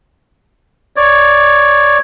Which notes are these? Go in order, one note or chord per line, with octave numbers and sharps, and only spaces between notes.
C#5 D5